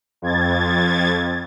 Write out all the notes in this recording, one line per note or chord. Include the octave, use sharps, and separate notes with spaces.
F2 G#6 A6